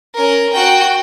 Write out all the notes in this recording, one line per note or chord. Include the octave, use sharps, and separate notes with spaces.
C#4 A#4
F#4 G5